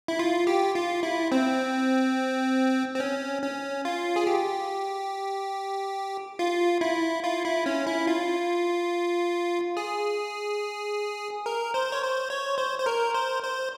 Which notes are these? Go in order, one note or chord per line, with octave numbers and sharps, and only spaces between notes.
E4
F4
G4
F4
E4
C4
C4
C#4
C#4
F4
G#4
G4
F4
E4
F4
E4
C#4
E4
F4
G#4
A#4
C5
C#5
C5
C#5
C5
C5
A#4
C5
C5